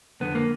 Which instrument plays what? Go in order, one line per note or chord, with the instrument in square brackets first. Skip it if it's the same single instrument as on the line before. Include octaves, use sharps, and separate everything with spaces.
[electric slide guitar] F2 D3 B3
A#3